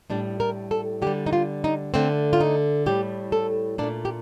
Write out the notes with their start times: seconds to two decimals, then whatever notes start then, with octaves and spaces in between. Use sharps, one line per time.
0.10 A2 G3 D4
0.40 A#4
0.71 A4
1.02 D3 G4
1.07 G3
1.26 D#4
1.33 F4
1.64 D#4
1.94 D3 A3 C4
2.33 F4
2.41 D#4
2.86 A2 G3 G4
3.32 A4
3.78 A#2 D4
3.83 A3
4.05 G4